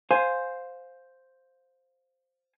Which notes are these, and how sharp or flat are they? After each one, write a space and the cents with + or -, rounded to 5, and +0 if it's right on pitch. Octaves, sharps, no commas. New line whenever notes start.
C5 +0 F5 +15 G#5 +0